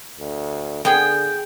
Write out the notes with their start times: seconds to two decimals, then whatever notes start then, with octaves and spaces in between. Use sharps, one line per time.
0.19 D2
0.85 D3 B3 G#4 G5